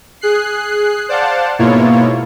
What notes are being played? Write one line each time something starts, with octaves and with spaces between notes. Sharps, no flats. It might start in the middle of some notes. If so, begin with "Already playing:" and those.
G#4 F#6 C7
C5 D5 F5 F#5 A5
G#2 B2 A#3 E4 F4 C#5